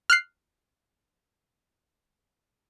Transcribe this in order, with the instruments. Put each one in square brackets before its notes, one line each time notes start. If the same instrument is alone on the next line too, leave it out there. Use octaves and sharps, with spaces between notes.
[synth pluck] F6 F#6 C7